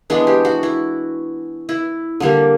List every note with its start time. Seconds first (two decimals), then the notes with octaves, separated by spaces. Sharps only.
0.10 E3 G#3 B3 D4
0.27 G4
0.45 F#4
0.63 E4
1.69 E4
2.20 D3 G3 A#3